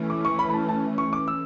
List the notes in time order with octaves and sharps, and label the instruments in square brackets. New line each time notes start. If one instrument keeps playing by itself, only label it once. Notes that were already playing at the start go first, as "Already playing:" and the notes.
Already playing: [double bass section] E3 A3 C#4
[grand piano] D6
C#6
B5
B5
A5
A5
C#6
D6
E6